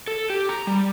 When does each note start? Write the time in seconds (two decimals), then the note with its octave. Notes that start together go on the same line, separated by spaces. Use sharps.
0.08 A4
0.30 G4
0.49 A#5
0.67 G3